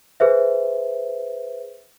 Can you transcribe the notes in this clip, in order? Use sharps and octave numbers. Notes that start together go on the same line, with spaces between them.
G#4 B4 C5 E5